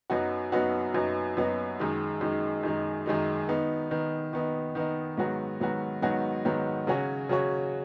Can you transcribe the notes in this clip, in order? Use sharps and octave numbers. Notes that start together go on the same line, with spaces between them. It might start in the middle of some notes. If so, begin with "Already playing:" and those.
F#2 F#3 B3 D#4 F#4
F#2 F#3 B3 D#4 F#4
F#2 F#3 B3 D#4 F#4
F#2 F#3 B3 D#4 F#4
F#2 D#3 G#3 D#4
F#2 D#3 G#3 D#4
F#2 D#3 G#3 D#4
F#2 D#3 G#3 D#4
D#3 B3 D#4
D#3 B3 D#4
D#3 B3 D#4
D#3 B3 D#4
G#2 D#3 F#3 B3 F#4
G#2 D#3 F#3 B3 F#4
G#2 D#3 F#3 B3 F#4
G#2 D#3 F#3 B3 F#4
C#3 F#3 C#4 F#4 C#5
C#3 F#3 C#4 F#4 C#5